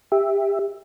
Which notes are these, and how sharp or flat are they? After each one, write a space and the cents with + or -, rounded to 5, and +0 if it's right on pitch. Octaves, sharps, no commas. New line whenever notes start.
G4 +25 E5 +0